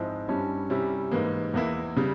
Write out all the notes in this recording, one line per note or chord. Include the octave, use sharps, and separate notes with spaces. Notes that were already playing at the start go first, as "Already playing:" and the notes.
Already playing: G#2 F3 G#3 C4 E4
G2 G3 C#4 E4
C3 G3 C#4 E4
G#2 E3 A#3
E2 E3 A#3 E4
C#3 G3